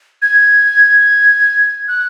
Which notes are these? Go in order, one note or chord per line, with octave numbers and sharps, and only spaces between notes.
G#6
F#6